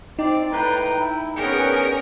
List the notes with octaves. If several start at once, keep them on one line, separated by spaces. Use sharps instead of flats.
C4 D#4 D5
A2 B4 G5 A#5
E4
B3 C#4 D4 G#4 A#4 G5